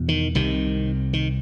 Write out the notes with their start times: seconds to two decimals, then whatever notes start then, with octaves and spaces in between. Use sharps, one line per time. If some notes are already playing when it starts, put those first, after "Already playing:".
Already playing: E2 B2
0.08 D#3
0.35 C2 C3 D#3
1.13 D#3